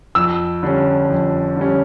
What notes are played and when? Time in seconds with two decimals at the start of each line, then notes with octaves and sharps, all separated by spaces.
0.15 F2 E6
0.63 D3 G3 C#4
1.10 F2
1.57 D3 G3 C#4